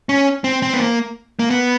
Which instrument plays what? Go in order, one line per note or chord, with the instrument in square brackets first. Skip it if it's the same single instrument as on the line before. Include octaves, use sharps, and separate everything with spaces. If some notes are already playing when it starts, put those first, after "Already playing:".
[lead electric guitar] C#4
C4
C4
B3
A#3
A#3
B3